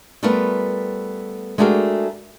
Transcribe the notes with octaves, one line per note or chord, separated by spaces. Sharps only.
G3 A3 B3 F4 A#4 B4
G#3 A3 D4 F#4 G4 A#4